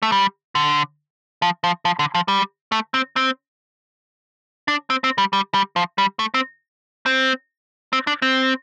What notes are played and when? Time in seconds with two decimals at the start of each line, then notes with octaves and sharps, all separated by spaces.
0.02 A3
0.12 G3
0.55 D3
1.42 F3
1.64 F3
1.85 F3
1.99 D3
2.15 F3
2.28 G3
2.72 A3
2.94 C4
3.16 C4
4.68 D4
4.90 C4
5.04 C4
5.18 G3
5.33 G3
5.54 G3
5.76 F3
5.98 G3
6.19 A3
6.34 C4
7.06 C4
7.93 C4
8.07 D4
8.22 C4